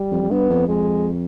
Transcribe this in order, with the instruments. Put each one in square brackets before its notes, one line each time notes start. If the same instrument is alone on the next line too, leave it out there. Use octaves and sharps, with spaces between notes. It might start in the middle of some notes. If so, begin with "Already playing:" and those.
Already playing: [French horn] G3
[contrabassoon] F2
F2
[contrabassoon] G2 [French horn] B3
[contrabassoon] F2
[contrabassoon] F2 [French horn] G#3